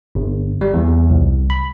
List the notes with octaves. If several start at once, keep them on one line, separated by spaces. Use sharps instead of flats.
G1
G3
E2
C2
B5